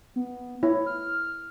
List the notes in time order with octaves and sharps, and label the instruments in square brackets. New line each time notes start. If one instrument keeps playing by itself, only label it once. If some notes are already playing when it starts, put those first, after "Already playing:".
[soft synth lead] B3
[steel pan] E4 [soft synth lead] C#5
[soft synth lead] F6